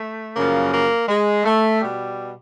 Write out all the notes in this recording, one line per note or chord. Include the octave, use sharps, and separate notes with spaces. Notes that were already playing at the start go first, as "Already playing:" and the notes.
Already playing: A3
F#2 C#3 F3 A#3
A#3
G#3
A3
B2 G3